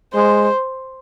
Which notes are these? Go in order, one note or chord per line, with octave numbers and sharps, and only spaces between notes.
G#3 C5